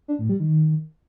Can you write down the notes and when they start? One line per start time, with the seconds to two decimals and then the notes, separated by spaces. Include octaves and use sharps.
0.08 D4
0.19 A2
0.29 G3
0.40 D#3